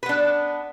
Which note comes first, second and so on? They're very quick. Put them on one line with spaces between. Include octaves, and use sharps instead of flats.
B4 B3 D4